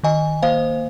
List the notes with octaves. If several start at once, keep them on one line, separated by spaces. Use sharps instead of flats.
D#3 D#5 G#5
A#3 C5 F5